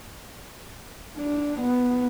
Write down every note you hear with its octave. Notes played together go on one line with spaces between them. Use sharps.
D4
B3